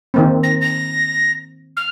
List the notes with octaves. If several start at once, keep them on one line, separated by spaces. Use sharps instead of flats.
D#3 A#3 C4
A#6
A#6
F6